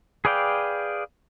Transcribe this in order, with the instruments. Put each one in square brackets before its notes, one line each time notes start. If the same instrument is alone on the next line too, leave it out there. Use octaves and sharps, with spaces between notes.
[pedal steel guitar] G#4 B4 D5 F5 G5